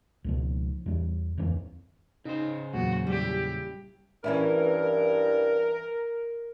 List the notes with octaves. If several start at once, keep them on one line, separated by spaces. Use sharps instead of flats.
C#2 B2 F3
E2 G3
D1 F2 E3 C4
C#3 D#4 C5
E2 A#2 F#3 F#4
G3 E4 G4
G2 E3 C#4 E4 A#4